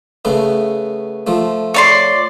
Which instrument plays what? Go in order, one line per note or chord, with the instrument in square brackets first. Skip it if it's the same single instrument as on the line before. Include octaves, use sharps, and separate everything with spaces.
[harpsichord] C#3 A3 B3
F3 A3
[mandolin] C#5 D5 C6